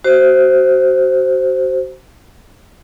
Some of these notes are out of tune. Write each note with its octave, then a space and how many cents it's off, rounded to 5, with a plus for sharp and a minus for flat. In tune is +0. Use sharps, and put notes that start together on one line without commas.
F#4 +30 C5 +0